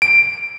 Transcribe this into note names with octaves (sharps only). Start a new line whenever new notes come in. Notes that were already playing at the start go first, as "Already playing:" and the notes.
D7